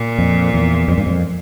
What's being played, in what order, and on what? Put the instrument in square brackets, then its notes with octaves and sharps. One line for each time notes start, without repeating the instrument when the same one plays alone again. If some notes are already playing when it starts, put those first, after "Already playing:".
Already playing: [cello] A#2
[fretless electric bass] F2
E2
F2
G2
F2